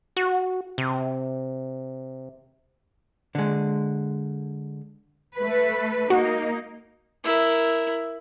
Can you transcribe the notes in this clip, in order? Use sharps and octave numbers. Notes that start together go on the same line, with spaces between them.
F#4
C3
D3 G#3
A3 B4
A#3 D#4 F#4
E4 A#4